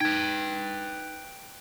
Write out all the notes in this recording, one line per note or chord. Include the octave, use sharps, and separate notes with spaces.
D#4 B4 G5 G#6